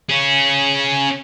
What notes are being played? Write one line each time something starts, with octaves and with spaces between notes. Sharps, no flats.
C#4 G#4